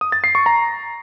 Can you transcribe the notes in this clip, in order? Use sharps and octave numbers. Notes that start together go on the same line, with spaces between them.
D#6
A6
C7
C#6
A#5